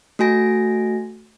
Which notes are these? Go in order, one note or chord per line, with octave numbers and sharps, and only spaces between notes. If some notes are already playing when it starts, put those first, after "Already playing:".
A3 F#4 G#5 A#6